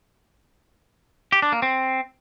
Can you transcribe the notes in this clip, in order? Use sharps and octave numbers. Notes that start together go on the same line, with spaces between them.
G4
D4
A#3
C4